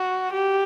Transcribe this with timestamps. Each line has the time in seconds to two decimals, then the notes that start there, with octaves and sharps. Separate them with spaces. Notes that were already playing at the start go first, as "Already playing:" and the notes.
Already playing: F#4
0.33 G4